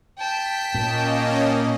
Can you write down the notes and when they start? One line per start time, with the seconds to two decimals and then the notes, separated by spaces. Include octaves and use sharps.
0.19 G5 A5 B6
0.74 A#2 A#3 C#4 D#5